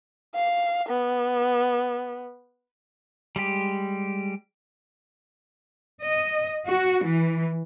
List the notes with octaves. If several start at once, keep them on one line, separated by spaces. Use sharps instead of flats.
F5
B3
G3 G#3 G4
D#5
F#4
E3